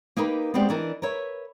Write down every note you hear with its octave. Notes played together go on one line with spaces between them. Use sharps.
A#3 D#4 G4 A#4 B4
G#3 B3 C4 G4 D5
E3 D4 D#4 A#4
A#4 B4 C#5 E5